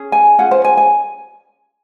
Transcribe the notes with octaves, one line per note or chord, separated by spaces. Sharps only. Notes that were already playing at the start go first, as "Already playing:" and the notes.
Already playing: C#4 G#4
G#5
C#4 F4 G#4 F#5
C5
G#5
G#5